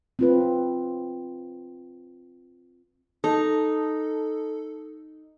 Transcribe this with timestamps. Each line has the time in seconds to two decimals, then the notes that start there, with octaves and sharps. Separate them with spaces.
0.19 C4 F4 B4
3.24 D#4 A4